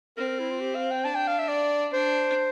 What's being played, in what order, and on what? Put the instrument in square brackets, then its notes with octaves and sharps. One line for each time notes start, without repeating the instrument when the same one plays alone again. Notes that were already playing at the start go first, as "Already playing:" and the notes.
[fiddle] C4 [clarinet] A#4
[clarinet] A#4
E4
F4
G4
F5
G5
[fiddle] D4 [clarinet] A5
[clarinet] G5
F5
E5
D5
[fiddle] D4 [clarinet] C5